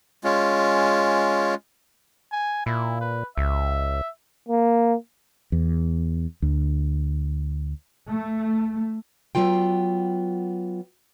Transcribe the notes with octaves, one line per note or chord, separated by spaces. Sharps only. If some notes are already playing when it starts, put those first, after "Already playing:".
G#3 C#4 F4
G#5
A#2 E4
B4
C#2 E5
A#3
E2
D2
A3
F#3 B3 F4 G5